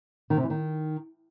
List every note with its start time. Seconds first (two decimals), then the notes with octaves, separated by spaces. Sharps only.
0.30 D#3
0.37 C3
0.43 E3
0.50 D#3